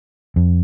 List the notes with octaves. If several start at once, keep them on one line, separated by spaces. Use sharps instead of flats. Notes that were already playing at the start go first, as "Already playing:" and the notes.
F2